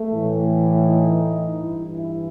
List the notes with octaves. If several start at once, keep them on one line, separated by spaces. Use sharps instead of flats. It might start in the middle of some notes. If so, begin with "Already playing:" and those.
Already playing: A3
A2 E3
D#4
G2 E3 E4
E4